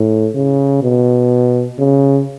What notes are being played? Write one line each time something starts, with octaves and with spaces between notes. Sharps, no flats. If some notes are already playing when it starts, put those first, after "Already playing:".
Already playing: A2
C#3
B2
C#3